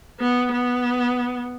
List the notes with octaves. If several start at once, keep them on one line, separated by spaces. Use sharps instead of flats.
B3
B3